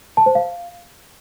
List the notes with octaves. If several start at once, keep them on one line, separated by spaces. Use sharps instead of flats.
A5
C5
F5